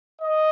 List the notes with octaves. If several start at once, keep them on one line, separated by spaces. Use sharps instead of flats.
D#5